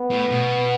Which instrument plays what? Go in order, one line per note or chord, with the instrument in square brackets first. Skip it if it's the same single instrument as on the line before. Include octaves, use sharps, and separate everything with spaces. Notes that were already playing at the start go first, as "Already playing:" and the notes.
Already playing: [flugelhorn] B3
[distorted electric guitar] A2
B2